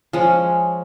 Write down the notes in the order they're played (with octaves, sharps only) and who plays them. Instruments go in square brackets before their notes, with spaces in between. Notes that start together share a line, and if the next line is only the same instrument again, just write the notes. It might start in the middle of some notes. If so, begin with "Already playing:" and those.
[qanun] F3 G#3 C#4